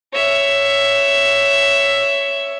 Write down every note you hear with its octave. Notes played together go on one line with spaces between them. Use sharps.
C#5 E5